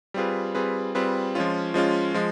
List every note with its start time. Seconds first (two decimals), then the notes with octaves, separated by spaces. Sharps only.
0.14 G3 C4 F4 G#4 B4
0.55 G3 C4 F4 G#4 B4
0.95 G3 C4 F4 G#4 B4
1.35 F3 G#3 C#4 F4
1.74 F3 G#3 C#4 F4
2.14 F3 G#3